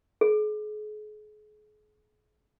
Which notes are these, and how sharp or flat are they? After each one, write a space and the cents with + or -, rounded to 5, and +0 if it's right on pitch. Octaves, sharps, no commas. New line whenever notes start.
G#4 +40